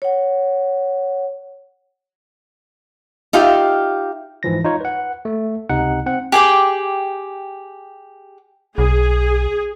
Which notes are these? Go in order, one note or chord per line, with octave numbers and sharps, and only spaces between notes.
C#5 F#5
D#4 F4 G4 E5 F5
G#2 E3 F3 A#6
D#4 F4 C#5
B4 F#5
A3
C#2 C3 D#4 F#5
C4 F#5
G4 G#4 G5 D6
B1 G#4